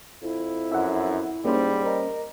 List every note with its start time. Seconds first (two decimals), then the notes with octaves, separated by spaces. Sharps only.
0.23 F2 E4
0.72 F#2 E5 F#5
1.45 G#2 G3 A#3 C#4 C5
1.85 A#4 D#5